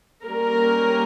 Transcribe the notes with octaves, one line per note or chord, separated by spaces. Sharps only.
G3 A#3 C#4 A#4